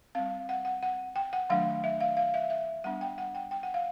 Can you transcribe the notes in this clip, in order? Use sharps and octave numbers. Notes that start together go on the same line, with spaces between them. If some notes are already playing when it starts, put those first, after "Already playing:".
G3 C4 F5
F#5
F#5
F#5
G5
F#5
D#3 F#3 A3 D4 F5
E5
F5
F5
E5
E5
G3 B3 D4 F#5
G5
F#5
G5
G5
F#5
F5